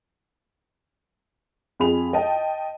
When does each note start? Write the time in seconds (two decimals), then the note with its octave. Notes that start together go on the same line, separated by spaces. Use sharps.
1.80 F2 G#4 B5 F7
2.13 D#5 G5 A5